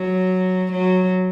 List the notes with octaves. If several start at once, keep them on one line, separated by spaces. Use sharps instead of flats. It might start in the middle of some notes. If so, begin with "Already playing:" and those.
Already playing: F#3
F#3